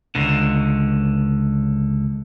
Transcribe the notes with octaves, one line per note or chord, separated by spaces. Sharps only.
C#2 D3